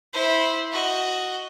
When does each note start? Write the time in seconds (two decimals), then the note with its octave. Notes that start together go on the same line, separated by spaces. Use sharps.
0.13 E4 C5
0.72 F#4 D#5